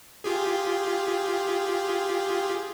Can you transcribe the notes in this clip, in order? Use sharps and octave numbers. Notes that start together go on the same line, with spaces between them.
F4 G4 G#4